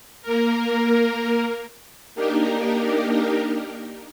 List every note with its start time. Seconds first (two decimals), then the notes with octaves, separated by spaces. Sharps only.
0.22 A#3 A#4
2.15 A#3 D4 D#4 G4 A#4